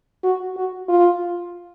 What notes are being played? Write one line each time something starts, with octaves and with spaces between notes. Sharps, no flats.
F#4
F#4
F4